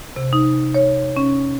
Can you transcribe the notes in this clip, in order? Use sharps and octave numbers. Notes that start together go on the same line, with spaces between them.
C3
D#4
C#5
C#4